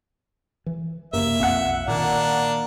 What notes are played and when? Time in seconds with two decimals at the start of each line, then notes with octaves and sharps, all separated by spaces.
0.66 E3
1.13 F#2 C3 A#3 E5
1.40 B1 F2 C4 F5 F#5
1.88 A#2 D#3 A#3 D4